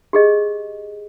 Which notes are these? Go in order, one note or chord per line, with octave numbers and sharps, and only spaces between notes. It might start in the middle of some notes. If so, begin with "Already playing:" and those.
G4 G#4 D#5